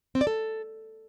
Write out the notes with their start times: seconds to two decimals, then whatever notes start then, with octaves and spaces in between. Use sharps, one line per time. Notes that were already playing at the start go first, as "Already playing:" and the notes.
0.15 C4
0.21 D5
0.27 A4